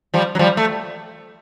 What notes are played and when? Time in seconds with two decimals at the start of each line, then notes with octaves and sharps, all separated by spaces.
0.14 F3 G3
0.35 F#3
0.39 F3 G3
0.57 A3